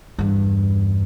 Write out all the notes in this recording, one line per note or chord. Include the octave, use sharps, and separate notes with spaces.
E2 G2